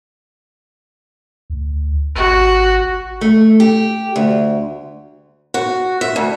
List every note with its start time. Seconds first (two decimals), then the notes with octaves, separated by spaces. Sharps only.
1.50 D2
2.16 G#1 F#4
3.21 A3
3.60 G4
4.16 D2
5.54 F#4
6.01 E5
6.16 D2